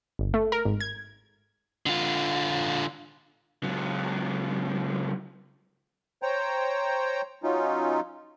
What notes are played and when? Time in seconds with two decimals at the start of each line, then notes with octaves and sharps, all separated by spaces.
0.19 G1
0.34 A3
0.52 A#4
0.65 G#1
0.80 G#6
1.86 D3 F4
3.63 C#2 F#3
6.22 C5 C#5 G5 A#5
7.43 F#3 C#4 D#4 F4